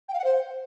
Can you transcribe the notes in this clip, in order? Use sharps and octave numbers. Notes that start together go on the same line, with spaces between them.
G5
F5
F#5
C5